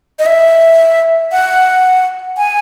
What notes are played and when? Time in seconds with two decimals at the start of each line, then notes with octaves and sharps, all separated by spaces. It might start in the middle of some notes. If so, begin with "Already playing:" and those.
0.19 D#5
0.26 E5
1.32 F#5
2.38 G#5